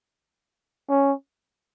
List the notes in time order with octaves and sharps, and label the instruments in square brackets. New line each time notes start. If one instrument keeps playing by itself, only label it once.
[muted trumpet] C#4